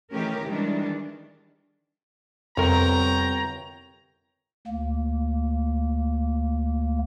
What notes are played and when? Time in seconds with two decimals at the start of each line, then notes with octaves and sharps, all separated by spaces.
0.11 D#3 E3 A3 C#4 G4 A#4
0.46 D#3 E3 G3 G#3 D4
2.57 G1 F2 C3 A#4 C#5 G5 A#5
4.67 D2 A#3